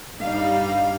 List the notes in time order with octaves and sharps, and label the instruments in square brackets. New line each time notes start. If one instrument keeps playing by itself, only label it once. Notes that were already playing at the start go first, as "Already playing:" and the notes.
[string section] G2 G3 D#4 F5